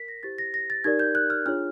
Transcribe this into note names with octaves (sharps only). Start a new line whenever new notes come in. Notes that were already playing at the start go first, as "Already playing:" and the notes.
Already playing: A#4 B6
A#6
E4 G4 C5 A6
A#6
A#6
A6
D#4 G4 A#4 D5 G#6
G6
F#6
F6
D4 F4 G#4 C#5 F6